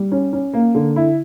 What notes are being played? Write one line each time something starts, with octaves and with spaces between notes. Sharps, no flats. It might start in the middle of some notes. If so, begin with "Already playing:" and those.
Already playing: G3
C#4
C#4
A#3
D3
E4